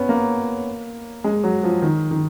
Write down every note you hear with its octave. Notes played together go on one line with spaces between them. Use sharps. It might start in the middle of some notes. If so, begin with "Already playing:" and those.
Already playing: B3 C#4
A#3
G#3
F#3
F3
D#3
D#3